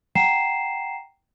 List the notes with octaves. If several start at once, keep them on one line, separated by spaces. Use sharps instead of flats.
F#5 G5 A#5 C7 E7